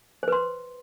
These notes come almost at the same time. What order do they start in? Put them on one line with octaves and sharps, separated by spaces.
C5 B4 C6